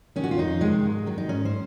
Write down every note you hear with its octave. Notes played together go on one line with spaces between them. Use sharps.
C3 D#3 C#4
F#4
F4
F2 D#4
C3 D#3 G#3
G#2
D#3 F#3
D#4
G#2 C#4
C5